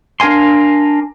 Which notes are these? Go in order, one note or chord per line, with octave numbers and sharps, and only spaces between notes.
D4 A#4 F5 G#5 C6